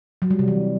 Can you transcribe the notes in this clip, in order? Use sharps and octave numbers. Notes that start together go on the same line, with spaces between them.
F#3
G3
C3
E3